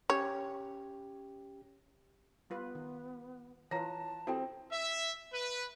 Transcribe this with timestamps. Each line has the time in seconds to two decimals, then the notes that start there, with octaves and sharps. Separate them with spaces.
0.10 C#4 G4 C#5
2.50 G3 B3 F4 B4
2.75 D#3
3.71 E3 F4 B4 C#5 A5 A#5 A#6
4.27 C4 E4 F#4 G4 A4 G5
4.72 E5
5.33 B4